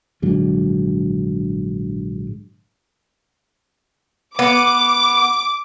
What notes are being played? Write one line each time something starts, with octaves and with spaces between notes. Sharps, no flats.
A#1 G#2 D3 F#3
B3 D6